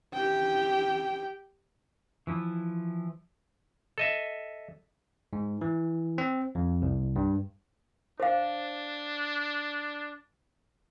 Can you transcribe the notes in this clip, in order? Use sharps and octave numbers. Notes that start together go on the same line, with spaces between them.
G4 G5
E3 F3 E4
A4 D#5 E5
G#2
E3
C4
F2
C2
G2
D4 C5 F5